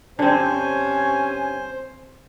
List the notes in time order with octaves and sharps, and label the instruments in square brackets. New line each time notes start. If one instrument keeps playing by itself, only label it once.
[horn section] G2 C#4 G#5 [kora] D3 C4 [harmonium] C5